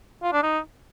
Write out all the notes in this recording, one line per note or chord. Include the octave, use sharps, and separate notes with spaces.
F4
D4
D#4